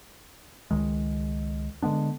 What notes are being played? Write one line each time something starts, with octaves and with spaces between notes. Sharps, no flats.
C#2 D#3 G#3
D3 G#3 B3 D4